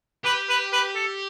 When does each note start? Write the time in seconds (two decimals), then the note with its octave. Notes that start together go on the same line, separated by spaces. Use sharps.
0.25 G4 B4
0.49 B4
0.73 B4
0.96 A4